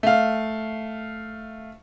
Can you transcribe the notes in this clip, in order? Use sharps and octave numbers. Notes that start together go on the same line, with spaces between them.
A3 F5